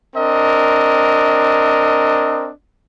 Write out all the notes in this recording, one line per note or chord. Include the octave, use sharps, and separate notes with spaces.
C4 D4 A#4 D#5